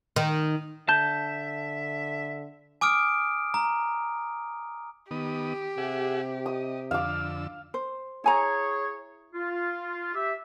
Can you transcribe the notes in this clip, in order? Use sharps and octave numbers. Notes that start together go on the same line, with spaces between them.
D#3
D3 E5 A5 G6
G#5 D6 D#6 F6 D7
A#5
D#3 B3 G4 D#6
C3 G#4 E5 F#5
D#5 D#6
F2 D3 F5 D6 E6
C5
E4 G#4 C#5 G#5 A#5
F4
G4 E5